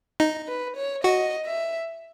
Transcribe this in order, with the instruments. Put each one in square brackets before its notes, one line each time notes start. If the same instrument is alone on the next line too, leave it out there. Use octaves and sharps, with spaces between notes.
[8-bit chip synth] D#4
[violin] B4
C#5
[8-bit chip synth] F#4 [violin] D#5
[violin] E5